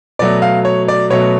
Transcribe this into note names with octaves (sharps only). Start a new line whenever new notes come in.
B2 F#3 A3 D5
F5
C#5
D5
B2 F#3 A3 C#5